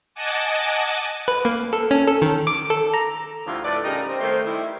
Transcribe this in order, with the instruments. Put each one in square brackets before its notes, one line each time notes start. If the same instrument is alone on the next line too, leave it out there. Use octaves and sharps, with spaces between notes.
[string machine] D#5 F#5 G#5 A5 D6
[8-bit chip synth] B4
A#3
A4
C#4
A4
D#3
D6
A4
A#5
[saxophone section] D2 D3 F3 G3 E4 F4
A2 A4 B4 D5
C#3 G3 D#4 G4 A#4
C4
D#3 A3 C5
D#3 G3 E4